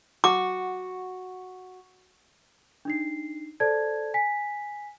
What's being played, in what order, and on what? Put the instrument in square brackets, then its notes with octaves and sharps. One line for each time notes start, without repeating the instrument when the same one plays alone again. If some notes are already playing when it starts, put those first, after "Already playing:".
[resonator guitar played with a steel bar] F#4 [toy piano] D6
[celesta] D4 D#4 C7
A4 C5 D5 A5 G#6
G#5 B6